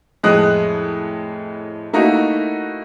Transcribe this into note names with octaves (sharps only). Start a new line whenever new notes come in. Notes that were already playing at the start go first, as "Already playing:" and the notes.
F2 A2 G#3 D#5 D#6 F#6
A3 A#3 D#4 E4 F#4